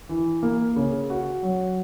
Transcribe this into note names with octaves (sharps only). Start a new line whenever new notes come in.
E3
A#3
C#3
F#4
F#3